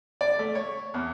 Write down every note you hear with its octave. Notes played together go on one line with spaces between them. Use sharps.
D5
A3
C#5
E2